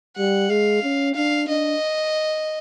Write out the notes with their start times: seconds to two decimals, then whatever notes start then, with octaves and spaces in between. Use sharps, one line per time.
0.18 G3 F#5
0.50 G#3 F5
0.83 C#4
1.15 D4 F5
1.48 D4 D#5